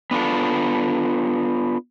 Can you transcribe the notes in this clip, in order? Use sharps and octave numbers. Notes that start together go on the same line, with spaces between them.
B3 D4 F4 A4